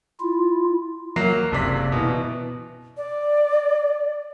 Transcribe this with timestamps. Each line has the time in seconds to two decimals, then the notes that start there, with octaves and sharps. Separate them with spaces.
0.20 E4 F4
1.16 F#3 A#3 C7
1.51 F#1 C3 D5 B6
1.92 B2 E3
2.97 D5